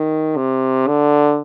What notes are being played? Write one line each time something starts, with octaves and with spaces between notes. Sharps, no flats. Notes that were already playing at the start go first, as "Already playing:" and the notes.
Already playing: D#3
C3
D3